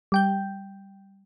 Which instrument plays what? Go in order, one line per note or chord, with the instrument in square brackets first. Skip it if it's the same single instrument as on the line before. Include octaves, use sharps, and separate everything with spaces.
[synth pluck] G3 G5 G6